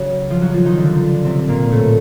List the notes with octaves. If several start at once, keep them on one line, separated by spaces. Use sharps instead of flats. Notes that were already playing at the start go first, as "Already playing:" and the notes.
Already playing: C#3 F#3 C#4 F#4
F3 F4
F#3 F#4
F3 F4
D#3 D#4
D3 D4
C3 C4
A#2 A#3
A2 A3